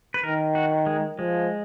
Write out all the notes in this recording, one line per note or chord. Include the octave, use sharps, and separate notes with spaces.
B4
D#3 A#4
F#4
G#3
F3 G#3